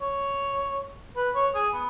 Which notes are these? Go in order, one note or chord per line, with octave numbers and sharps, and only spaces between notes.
C#5
B4
C#5
G#4
B3